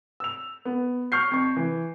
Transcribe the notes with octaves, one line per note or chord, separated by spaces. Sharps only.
E6 F7
B3
C#6 F6 G6 C7
F2 C#6
E3